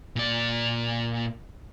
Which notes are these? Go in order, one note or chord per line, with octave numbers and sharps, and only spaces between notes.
A#2 D5